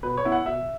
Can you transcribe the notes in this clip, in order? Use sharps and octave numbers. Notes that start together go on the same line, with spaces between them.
B2 B4
C#5
B3 E4
F#5
B2 E5